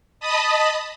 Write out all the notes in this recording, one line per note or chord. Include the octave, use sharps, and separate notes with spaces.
D#5 A5 B5 D#6